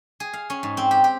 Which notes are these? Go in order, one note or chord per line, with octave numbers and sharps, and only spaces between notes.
G#4
F5
C#4
G#2
C4
G4
G4